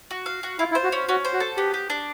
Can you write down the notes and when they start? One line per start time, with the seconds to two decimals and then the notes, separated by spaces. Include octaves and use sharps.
0.11 F#4
0.26 F5
0.43 F#4
0.59 E4 F4
0.71 E4
0.75 C5
0.84 F#4
0.92 C#4
1.09 C#4 F#4
1.25 C5
1.33 F#4
1.40 A4
1.57 B3 G4
1.74 G4
1.90 D4